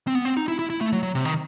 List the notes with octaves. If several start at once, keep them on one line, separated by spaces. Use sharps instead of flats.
C4
B3
C4
D#4
E4
E4
E4
A3
F#3
F#3
C3
D#3